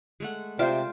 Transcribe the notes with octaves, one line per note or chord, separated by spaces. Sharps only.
G#3 A3 F#5
C3 F4 C5 D5 E5 F6